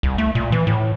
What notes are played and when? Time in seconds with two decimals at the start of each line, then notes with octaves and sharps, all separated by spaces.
0.03 C2
0.18 A3
0.35 A#2
0.52 E3
0.67 A2